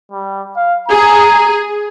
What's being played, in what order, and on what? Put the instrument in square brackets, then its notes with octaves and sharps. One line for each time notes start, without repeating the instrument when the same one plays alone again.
[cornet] G3
F5
[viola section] G#4 [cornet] A#5